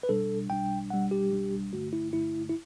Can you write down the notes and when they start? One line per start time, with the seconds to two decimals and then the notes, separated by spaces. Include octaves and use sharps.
0.03 B4
0.09 B1 B2 G3 D4 A4
0.50 B1 B2 G3 D4 G5
0.90 B1 B2 G3 D4 F#5
1.11 G4
1.32 B1 B2 G3 D4
1.73 G2 D3 A3 F#4
1.93 E4
2.13 G2 D3 A3 E4
2.49 E4